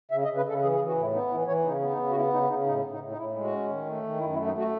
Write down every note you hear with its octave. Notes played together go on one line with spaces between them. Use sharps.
C#3 E5
D#5
C#3
B4
C#3 A4
E3 G#4
G#4
E3
F#4
A2 E4
B3 D#4
E3 E4
E3 C#5
C#3 D#4
B3
D#4
C#3
F#4
B3 E4
C#3 D#4
C#3 D#4
A2 D#4
A2
D#4
A2
D#4
A2 E4
G#3
F#4
C#4
D#3
A3
D#3
F#2 E4
E4
A3
D#4
A3 F#4